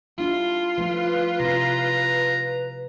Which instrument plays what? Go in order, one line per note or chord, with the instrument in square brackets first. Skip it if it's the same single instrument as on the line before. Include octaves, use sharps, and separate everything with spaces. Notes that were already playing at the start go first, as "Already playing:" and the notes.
[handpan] G3 D4 E4 [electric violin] F4
[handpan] F3 A3 E4 [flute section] B4
[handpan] C3 C#4 E4 [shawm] A#5